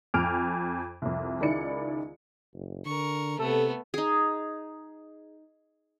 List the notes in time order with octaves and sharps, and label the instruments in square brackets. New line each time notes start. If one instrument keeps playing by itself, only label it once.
[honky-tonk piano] F2 G#5 F6 D7 F7
C2 F2
C#2 D#3 E4 D5 C#7
[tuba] F#1
[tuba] D3 [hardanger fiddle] A#4 C#6
[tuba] C3 [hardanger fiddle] A3 B3 [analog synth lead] A4
[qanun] D#4 G#4